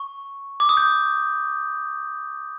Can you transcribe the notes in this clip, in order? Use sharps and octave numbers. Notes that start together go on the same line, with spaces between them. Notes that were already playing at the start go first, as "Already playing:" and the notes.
Already playing: C#6
D6
D#6
G6